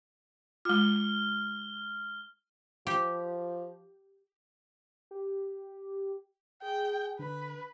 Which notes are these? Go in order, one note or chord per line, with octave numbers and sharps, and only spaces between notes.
G#3 F4 F6 G7
F3 G4
G4
G#4 G5
D3 B4